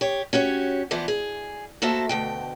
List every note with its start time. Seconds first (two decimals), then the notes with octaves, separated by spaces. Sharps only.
0.01 G4 C#5
0.33 C#4 F#4 G4 C#5
0.91 E3 F3 B3 D5
1.08 G#4
1.82 A#3 F#4 A4 C5 E5 A5
2.09 D2 B2 G5